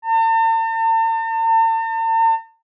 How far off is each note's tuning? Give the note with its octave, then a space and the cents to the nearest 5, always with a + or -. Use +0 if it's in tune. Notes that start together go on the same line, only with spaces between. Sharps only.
A5 +45